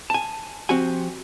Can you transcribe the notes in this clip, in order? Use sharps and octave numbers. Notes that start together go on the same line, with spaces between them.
G#5 A5
F3 C4 F#4 G4 G#5